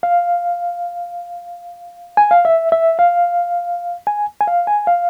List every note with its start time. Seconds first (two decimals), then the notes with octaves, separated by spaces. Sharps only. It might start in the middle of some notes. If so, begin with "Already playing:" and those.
0.03 F5
2.17 G#5
2.31 F5
2.45 E5
2.72 E5
2.99 F5
4.07 G#5
4.41 G#5
4.47 F5
4.67 G#5
4.87 F5